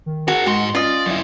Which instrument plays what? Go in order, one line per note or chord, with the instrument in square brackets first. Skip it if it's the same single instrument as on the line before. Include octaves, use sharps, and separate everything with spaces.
[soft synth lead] D#3
[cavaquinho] F#4 [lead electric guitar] G#4 A#4
[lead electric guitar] G#2 C6 [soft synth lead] G#3 [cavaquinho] F#4
[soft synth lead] C#4 [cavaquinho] F4 D#5 [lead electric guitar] D5
[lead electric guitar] F#2 E4